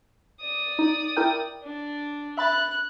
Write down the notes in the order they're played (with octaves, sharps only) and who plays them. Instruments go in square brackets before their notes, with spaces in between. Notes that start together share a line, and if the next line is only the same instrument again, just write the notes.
[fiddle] D5 D#6
[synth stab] D#4
E4 A#4 G5
[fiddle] D4
[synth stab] E5 B5 A6 [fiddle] F#6